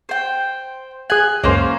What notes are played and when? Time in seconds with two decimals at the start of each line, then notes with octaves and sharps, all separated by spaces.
0.09 C5 G5
1.10 G#4 G#5 F#6
1.44 C#2 F#2 A#3 C#4 C5